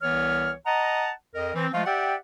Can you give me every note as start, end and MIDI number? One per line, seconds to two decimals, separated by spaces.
0.02 0.53 36
0.02 0.53 52
0.02 0.53 59
0.02 0.53 73
0.02 0.53 89
0.66 1.10 75
0.66 1.10 78
0.66 1.10 81
0.66 1.10 82
1.35 1.53 41
1.35 1.53 70
1.35 1.53 75
1.54 1.67 52
1.54 1.67 60
1.72 1.82 53
1.72 1.82 56
1.72 1.82 57
1.72 1.82 65
1.86 2.15 67
1.86 2.15 74
1.86 2.15 76
1.86 2.15 78
1.86 2.15 79